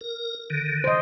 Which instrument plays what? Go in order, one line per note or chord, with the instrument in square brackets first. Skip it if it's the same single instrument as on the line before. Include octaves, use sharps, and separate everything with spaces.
[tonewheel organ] A#4
D3 D#3
[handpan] C5 D#5